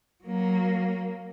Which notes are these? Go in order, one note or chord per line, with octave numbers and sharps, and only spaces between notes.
F#3 A#3